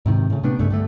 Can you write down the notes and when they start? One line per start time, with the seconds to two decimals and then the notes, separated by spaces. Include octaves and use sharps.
0.06 G#2 C3 D#3
0.30 A2 C#3
0.43 C3 A3 B3 D4
0.59 C2 G2 C#3 A3
0.70 G2 D3 A3